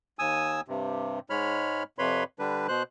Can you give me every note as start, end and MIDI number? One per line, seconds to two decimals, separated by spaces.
0.19 0.61 39
0.19 0.61 80
0.19 0.61 87
0.19 0.61 88
0.68 1.19 43
0.68 1.19 48
1.30 1.83 44
1.30 1.83 56
1.30 1.83 73
1.30 1.83 83
1.30 1.83 89
1.98 2.24 41
1.98 2.24 48
1.98 2.24 71
1.98 2.24 73
1.98 2.24 83
1.98 2.24 84
2.39 2.67 50
2.39 2.67 55
2.39 2.67 62
2.39 2.67 71
2.68 2.83 47
2.68 2.83 72
2.68 2.83 90